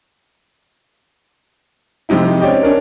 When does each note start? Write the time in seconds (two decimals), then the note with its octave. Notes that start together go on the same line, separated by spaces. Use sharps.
2.09 F2 G#2 C3 D#4 E4
2.41 C4 C#4 G4 D5 D#5 G5
2.63 C#4 D4 A#4